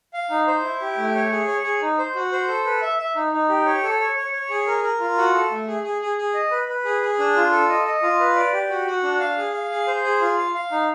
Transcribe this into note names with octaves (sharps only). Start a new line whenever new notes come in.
F5
D#4
C5
E4
G4
A3
C#5
G#4
C#5
G#4
D#4
C5
F#4
C5
A4
B4
E5
E5
D#4
D#4
G4
C#5
A4
C#5
C#5
C#5
G#4
A#4
A#4
F4
F#4
A4
A3
G#4
G#4
G#4
G#4
D#5
B4
B4
G#4
G#4
D4
F4
A4
D#5
D#5
F4
B4
D5
G4
F#4
F#4
D4
F5
G#4
F5
G#4
C5
G#4
F4
F5
F5
D#4